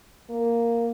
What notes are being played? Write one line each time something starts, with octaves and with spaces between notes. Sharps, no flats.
A#3